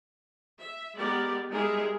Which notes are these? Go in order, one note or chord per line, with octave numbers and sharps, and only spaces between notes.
E5
G#3 B3 G4 A#4 D5
G3 G#3 D#4 G#4 A#4 E5